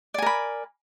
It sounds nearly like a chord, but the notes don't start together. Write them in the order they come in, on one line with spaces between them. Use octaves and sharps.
D5 G#5 A#4 B5